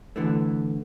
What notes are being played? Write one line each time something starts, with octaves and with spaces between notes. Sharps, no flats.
D3 E3 A3